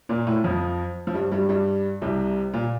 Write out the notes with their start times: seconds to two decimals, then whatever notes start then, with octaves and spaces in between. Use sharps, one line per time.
0.09 A#2 A#3
0.27 A2 A3
0.44 F2 F3
1.07 F3
1.14 G2 G3
1.32 G2 G3
1.49 G2 G3
2.02 C2 C3
2.54 A#2